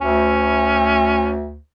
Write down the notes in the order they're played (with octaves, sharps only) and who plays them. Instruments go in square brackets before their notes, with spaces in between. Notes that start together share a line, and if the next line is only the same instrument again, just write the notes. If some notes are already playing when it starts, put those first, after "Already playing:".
[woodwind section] D2 [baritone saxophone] C#4